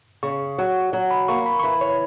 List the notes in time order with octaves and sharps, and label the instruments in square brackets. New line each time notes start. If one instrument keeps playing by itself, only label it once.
[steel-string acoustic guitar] C#3 [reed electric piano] C#6
[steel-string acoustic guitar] F#3
F#3
[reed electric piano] B5
[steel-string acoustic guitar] A#3 [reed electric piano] C#6
[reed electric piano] B5
C#6
[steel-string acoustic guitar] E3 [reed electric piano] B5
[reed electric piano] C#5